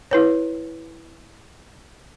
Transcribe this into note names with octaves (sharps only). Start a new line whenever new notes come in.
E4 B4 C#5